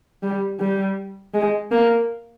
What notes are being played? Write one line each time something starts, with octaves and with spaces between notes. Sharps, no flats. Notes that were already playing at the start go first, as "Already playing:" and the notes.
G3
G3
G#3
A#3